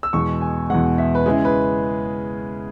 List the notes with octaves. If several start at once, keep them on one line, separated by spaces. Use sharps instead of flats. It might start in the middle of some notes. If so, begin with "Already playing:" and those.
E6
E2 B2 G#3 C#6
G#5
E2 B2 G#3 F#5
E5
B4
C#3 G#3 C#4 E4 G#4
B4